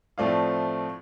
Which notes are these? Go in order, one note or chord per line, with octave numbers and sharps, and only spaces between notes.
A2 F3 A3 C4 F4 D5